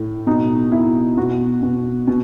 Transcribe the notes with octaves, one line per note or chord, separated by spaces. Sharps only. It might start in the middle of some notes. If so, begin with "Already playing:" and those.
Already playing: A2
B2 D#4
B2 E4
B2 F#4
B2
B2